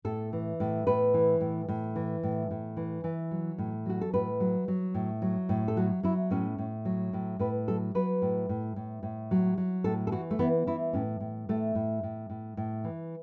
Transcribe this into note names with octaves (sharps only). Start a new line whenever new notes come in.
A2 A4
E3
A2
A2 B4
E3
A2
A2
E3
A2
A2
E3
E3
F#3
A2
F#3 F#4
A4
A2 B4
F#3
F#3
A2
F#3
A2
A4
F#3 F#4
F#3 E4
A2 C#4
A2
F#3
A2
A2 B4
F#3 A4
F#3 B4
A2
A2
A2
A2
F#3
F#3
A2 A4
A4
E3 F#4
A3
E3 B3
E3 E4
A2 C#4
A2
A2 A3
A2
A2
A2
A2
E3